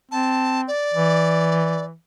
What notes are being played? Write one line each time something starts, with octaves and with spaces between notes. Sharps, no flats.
C4 A5
D5
E3